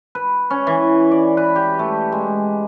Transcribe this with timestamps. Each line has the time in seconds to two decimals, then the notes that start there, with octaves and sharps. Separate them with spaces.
0.15 B4
0.50 C#4
0.67 E3
1.11 D5
1.37 B4
1.55 G4
1.79 A3
2.12 G#3